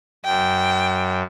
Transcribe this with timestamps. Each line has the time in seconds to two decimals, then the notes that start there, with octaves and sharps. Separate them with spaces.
0.25 F#2 G5